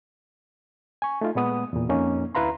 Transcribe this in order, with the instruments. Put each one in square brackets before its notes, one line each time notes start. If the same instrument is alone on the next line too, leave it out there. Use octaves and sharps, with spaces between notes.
[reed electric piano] G#5 C#6
A3 D#4 F4
A#2 G#3 B3 D#6
E2 A#2
F2 A#3 C#4 D#4
D2 E4 B4 F5 A#5 C6